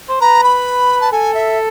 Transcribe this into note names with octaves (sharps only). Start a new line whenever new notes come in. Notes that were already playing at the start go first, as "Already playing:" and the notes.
C5
B4 A#5
B5
A5
A4 G#5
E5